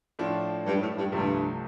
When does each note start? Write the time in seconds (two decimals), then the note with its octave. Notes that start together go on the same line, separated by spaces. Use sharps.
0.19 A2 F3 A3 D4 F4
0.66 G2
0.81 A2
0.97 G2
1.12 C2 G2 C3 F3 A3